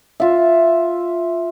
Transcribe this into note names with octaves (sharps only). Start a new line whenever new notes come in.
F4 E5